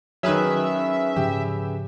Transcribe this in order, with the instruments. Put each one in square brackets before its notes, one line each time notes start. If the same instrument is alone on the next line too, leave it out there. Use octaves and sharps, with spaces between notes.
[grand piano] D#3 F#3 [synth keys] C#4 G#4 B4 [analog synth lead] E5
[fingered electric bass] G#2 C#3 F3 [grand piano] G4